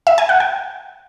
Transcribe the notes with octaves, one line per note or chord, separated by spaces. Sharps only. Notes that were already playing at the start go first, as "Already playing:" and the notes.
E5
G#5
F#5
G5